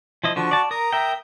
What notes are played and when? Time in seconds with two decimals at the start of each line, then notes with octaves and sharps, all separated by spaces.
0.24 F3 E4 D#5
0.36 D3 F3 F#4 C#6
0.51 D5 A5
0.71 A#4 A#5 D#6
0.93 A#4 E5 G5